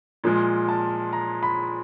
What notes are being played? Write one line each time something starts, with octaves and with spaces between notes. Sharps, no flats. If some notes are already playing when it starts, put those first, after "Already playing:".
A#2 F3 G#3
A5
A#5
B5